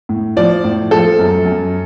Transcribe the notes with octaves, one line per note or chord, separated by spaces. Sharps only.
A2
F3 D5
A2
F3 A4
F#2
F#2